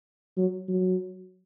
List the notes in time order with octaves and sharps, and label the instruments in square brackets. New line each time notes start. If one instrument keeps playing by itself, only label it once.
[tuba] F#3
F#3